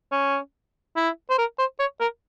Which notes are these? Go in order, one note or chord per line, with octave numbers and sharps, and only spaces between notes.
C#4
E4
C5
A#4
C5
C#5
A#4